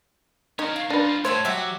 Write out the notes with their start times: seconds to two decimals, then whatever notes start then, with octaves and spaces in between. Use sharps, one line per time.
0.59 C#4 D#4 A#4 C#5
0.76 F5
0.90 D4 D#4 F4 B4
1.25 A2 C5 C#5 E5 A5
1.45 F#3 G4 E5 F#5